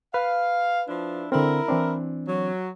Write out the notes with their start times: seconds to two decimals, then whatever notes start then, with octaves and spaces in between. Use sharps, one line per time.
0.14 B4 F5
0.88 F3 D4 E4
1.32 D3 C4 E4 A#4
1.68 E3 C4 D4
2.28 F#3